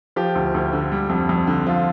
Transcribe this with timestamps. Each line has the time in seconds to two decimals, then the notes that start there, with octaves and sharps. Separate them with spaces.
0.16 F3 G4
0.35 D2
0.54 D2
0.73 D3
0.92 G3
1.10 F2
1.29 F2
1.47 D3
1.66 F3 F4